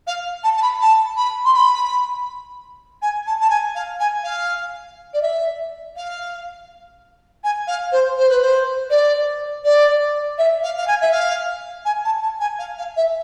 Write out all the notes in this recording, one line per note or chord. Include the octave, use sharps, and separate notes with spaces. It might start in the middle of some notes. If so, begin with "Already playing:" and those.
F5
A5
A5
B5
A5
B5
C6
B5
G#5
A5
A5
G#5
F5
G#5
F5
D5
E5
F5
G#5
F5
C5
C5
B4
C5
D5
D5
E5
F5
F5
G#5
E5
F5
G#5
A5
A5
G#5
F5
F5
E5